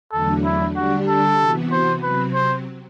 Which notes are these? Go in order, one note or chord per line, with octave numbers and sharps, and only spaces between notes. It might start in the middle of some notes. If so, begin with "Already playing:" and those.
E2 D3 F#3 A3 D4 A4
E4
D3 G3 D4 F#4 G4
A4
C3 E3 B3 F#4
C5
C3 F#3 C4 B4
C5